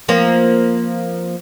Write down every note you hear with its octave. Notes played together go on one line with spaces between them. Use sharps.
F3 A#3 C4